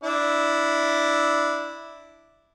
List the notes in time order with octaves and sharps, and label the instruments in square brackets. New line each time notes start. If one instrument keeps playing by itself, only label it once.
[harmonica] D4 E4